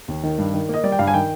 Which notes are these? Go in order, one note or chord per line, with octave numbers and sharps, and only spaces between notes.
D#2
D#3
G2
D#3
A#3 D#5
G3 D5
G5
G2 F5
G#5
D#3 G5